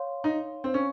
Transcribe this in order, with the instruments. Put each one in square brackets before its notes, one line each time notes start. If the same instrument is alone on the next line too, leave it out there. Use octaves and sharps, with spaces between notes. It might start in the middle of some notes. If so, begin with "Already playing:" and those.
Already playing: [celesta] C#5 F5 C6
[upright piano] D#4
C4
C#4